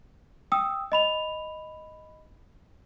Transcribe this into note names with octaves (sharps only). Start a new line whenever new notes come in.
G5 D#6 E6
D#5 B5 F7